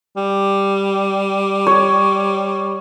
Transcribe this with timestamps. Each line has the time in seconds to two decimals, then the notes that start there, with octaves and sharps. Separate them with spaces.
0.17 G3
1.67 C#5